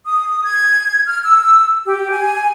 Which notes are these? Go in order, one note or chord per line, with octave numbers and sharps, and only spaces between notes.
D#6
G#6
F6
E6
G4
G#5